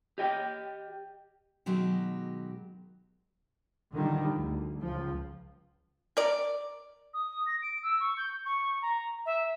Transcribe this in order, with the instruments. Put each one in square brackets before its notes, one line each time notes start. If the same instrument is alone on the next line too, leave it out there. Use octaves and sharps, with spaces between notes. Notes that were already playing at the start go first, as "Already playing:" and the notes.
[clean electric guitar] G4 D#5 G5
[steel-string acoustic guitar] B2 D#3 F#3 G#3 G4
[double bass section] D3 D#3 F3 G3
D2
C#2 F3
[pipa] A#4 D5
[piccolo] D#6
A#6
D7
E6
C#6
G6
C#6
A#5
E5